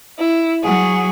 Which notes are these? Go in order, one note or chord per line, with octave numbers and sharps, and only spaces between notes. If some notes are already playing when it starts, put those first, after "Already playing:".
E4
F#3 F#4 G#4